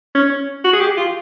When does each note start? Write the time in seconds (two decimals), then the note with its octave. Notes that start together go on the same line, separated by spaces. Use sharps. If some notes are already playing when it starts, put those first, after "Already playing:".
0.15 C#4
0.64 F#4
0.73 G#4
0.81 G4
0.97 F4